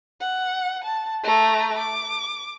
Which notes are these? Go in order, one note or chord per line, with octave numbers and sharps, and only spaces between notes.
F#5
A5
A3 A#5
D6